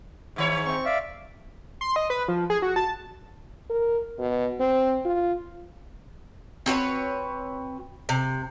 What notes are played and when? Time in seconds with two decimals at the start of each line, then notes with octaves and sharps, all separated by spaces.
0.36 G#2 D#3 C#5
0.65 C4 C#6
0.85 D5 E5 F5
1.81 C6
1.96 D#5
2.10 B4
2.28 F3
2.50 G#4
2.62 F#4
2.76 A5
3.70 A#4
4.19 B2
4.60 C4
5.05 F4
6.66 C4 F#4 B4 C#5
8.09 C3